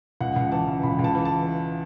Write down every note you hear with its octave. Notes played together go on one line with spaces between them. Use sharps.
C#2 F#5
C#2
E3 A5
C#3
C#2 B5
C#2
A5
E3
A5